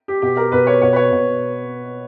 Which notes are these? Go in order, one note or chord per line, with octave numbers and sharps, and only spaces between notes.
G4
B2 G4
A#4
B2 B4
C#5
B2 C#5
B4
C#5
B2